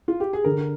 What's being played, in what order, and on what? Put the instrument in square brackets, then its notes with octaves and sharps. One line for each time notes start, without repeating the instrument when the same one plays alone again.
[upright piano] F4
G4
G#4
[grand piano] D3 [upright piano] A#4